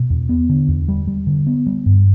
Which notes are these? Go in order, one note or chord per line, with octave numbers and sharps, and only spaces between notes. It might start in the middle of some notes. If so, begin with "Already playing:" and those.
Already playing: B2
E2
B3
D3
E2
G3
G3
D3
B3
G3
G2